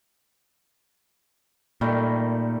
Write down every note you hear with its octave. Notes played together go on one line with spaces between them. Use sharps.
A#2 D#3 G3 A3